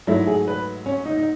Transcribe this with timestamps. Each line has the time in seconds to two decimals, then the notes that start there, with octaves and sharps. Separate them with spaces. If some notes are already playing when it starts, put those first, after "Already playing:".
0.07 G#2 F#3 A3 E4
0.27 G#4
0.48 B4
0.86 C#4
1.06 D#4
1.17 D#4